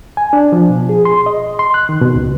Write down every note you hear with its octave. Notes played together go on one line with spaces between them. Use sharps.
G#5
D4
F3
B2
G#4
C6
D#5
C6
F#6
D#3
B2
C#2